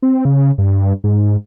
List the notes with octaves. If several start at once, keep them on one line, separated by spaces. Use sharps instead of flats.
C4
C#3
G2
G#2